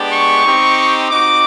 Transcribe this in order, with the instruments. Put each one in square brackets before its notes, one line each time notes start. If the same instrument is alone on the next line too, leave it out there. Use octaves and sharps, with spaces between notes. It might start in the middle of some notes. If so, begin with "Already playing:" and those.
Already playing: [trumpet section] G#3 B3 D4 G4
C#6
C4 D#4 G4
C4 D#4 F#4 D6